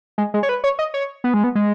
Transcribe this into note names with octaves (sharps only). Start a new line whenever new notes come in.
G#3
G#3
C#5
B4
C#5
D#5
C#5
B3
G#3
B3
G#3